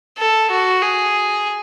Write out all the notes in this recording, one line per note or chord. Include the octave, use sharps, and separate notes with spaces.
A4
F#4
G#4